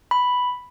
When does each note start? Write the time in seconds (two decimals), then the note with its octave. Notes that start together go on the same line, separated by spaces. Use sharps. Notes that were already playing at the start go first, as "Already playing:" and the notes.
0.11 B5